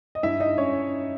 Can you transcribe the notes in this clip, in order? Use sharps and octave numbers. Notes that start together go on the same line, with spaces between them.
D#5
G2 E4 E5
D#4 D#5
G2 C#4 C#5